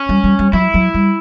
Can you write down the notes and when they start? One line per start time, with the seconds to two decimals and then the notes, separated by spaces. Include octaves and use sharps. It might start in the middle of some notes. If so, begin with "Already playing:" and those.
Already playing: C#4
0.09 G3
0.24 G3
0.39 G3
0.53 F#3 E4
0.74 F#3
0.94 G3